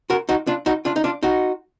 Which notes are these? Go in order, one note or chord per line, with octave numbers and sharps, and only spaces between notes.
F#4 A#4
D#4 F#4
D4 F4
D#4 F#4
D4 F4
D#4
D4 F4
D#4 F#4